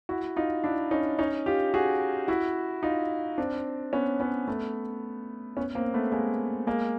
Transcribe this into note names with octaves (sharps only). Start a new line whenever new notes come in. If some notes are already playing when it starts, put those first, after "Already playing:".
E4 F#4
D#4 F4
D4 E4
C#4 D#4
C#4 D#4
F4 G4
F#4 G#4
E4 F#4
D#4 F4
C4 D4
B3 C#4
B3 C#4
A3 B3
B3 C#4
A#3 C4
A3 B3
G#3 A#3
G#3 A#3